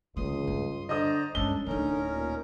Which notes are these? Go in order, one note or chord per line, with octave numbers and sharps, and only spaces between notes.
C#2 D3 C6 D#6
G2
D3 C5 D5 D#5 A#5 D#6
G2 G#3 C#4 D4 A4 G7
D1 D3 C#4 D#4 E4 A#4
A#2